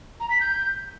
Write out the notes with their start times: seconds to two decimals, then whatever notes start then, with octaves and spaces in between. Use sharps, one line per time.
0.20 A#5
0.30 B6
0.41 G6